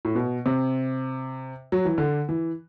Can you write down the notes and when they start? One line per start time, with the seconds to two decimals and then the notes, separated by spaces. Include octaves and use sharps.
0.05 A2
0.15 B2
0.46 C3
1.72 F#3
1.85 E3
1.98 D3
2.29 E3